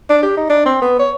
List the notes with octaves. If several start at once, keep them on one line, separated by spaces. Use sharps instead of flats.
D4
G4
D#4
D4
C4
B3
C#5